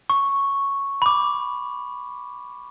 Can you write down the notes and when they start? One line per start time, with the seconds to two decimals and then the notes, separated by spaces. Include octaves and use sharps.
0.10 C#6
1.02 B5 D6